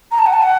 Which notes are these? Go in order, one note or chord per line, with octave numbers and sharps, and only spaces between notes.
A#5
A5
F#5
A5
F#5